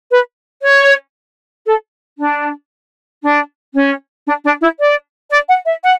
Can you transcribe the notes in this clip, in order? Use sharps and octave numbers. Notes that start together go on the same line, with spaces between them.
B4
C#5
A4
D4
D4
C#4
D4
D4
E4
D5
D5
F#5
E5
F#5